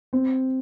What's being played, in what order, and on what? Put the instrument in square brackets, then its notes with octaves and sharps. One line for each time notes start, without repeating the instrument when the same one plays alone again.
[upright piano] C4